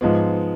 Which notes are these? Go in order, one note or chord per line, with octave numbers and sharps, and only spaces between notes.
G#2 F3 G#3 B3